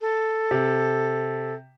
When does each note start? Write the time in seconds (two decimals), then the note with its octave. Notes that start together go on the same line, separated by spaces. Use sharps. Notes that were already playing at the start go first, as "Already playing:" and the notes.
0.01 A4
0.51 C3